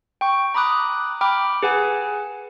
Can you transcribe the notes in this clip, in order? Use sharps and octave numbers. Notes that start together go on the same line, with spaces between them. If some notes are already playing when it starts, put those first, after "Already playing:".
G5 C#6
A#5 B5 D6 D#6 F#6
G5 B5 D6 F6
G#4 B4 F#5 G#5